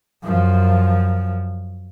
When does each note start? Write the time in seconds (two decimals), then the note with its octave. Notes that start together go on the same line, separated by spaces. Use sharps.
0.24 F#2 F3